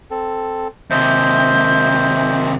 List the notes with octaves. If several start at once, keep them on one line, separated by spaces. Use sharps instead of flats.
C4 A4
D#2 C3 C5 D#5 E5 G6